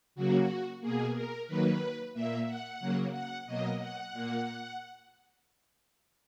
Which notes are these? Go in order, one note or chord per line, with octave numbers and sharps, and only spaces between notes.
C#3 F#3 A#3 F#4
B2 A#3 G#4
A#4
D#3 F#3 A#3 B4
A#2 A#3 E5
F#5
C#3 F#3 A#3
F#5
B2 F#3 A#3 D#5
F#5
A#2 A#3